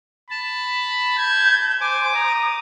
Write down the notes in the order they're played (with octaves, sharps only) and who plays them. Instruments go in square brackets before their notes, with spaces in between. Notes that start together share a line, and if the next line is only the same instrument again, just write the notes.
[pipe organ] A5 [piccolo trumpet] B5
[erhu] G6 [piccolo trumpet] G#6
[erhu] C5 [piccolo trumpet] G#5 [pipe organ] D6
[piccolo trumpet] A#5 [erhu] D#6